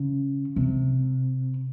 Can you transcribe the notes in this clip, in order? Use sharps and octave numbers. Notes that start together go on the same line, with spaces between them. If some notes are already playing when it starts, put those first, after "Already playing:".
Already playing: C#3
C3